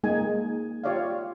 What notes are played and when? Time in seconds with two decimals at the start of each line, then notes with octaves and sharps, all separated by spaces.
0.03 G#3 A#3 D#4 G#5
0.84 F4 G4 C#5 D5 E5 F5